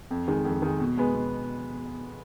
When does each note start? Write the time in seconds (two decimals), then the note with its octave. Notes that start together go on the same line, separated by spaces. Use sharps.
0.11 F2
0.28 D#3 G#3
0.45 F2
0.62 D#3 G#3
0.80 B2
0.97 G#3 B3
1.14 B2